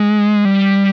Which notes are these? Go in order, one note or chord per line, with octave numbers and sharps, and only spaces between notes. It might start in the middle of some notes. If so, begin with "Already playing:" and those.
Already playing: G#3
G3